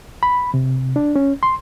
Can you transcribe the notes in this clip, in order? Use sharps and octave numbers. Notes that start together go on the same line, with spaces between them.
B5
C3
D4
C#4
C6